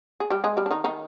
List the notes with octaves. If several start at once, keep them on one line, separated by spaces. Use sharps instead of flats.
G#4
G3 G4
G#3 G#4
G3 G4
D4
D#3 D#4
D#3 D#4